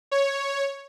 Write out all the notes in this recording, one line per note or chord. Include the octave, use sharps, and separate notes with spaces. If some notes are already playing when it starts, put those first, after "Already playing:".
C#5